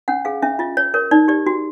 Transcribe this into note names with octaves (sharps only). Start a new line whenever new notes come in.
C#4 F#5
G#4 F5
C#4 E5
F4 D#5
C#5
A#4 C#5
D#4 D5
G4 D5
F#4